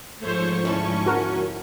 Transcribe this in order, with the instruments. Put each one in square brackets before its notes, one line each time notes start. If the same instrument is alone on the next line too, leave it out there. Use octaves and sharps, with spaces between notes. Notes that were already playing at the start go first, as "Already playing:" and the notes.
[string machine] G#2 F3 C#6 [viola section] A3 C5 C#5
[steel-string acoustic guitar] D2 E4 A5 [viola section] C#4
[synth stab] F#4 A#4